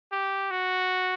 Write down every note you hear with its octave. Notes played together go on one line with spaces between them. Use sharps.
G4
F#4